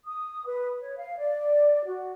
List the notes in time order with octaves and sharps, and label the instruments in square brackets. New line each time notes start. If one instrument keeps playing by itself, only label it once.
[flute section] D#6
B4
C#5
F5
D5
F#4